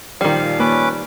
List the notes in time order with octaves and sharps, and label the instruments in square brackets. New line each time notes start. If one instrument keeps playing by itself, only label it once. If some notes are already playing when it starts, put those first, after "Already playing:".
[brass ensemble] A#2 F3 [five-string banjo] D#3 G3 [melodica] F5
[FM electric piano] A#3 [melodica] C#4 B4 D6